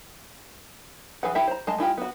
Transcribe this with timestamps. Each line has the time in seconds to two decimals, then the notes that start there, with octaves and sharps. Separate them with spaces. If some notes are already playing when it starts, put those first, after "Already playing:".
1.23 E3 G#4 B4 F#5
1.35 E4 G4 E5
1.47 C5 A#5
1.67 G#3 D#5 A5
1.78 G#3 E4 F4 G4
1.98 B3 F#4